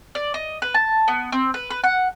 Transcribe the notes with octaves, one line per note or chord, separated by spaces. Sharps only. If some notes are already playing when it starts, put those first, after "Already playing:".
D5
D#5
B4
A5
B3
C4
B4
B4
F#5